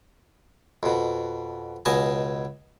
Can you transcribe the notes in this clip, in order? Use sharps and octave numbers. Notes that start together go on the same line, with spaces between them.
F2 B2
C#2 B2 D#5 G#5 A5